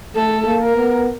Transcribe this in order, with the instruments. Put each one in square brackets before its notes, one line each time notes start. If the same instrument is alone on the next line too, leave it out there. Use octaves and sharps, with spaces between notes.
[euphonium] A3 [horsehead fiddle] A4
[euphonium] A#3
[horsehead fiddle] A#4
[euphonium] B3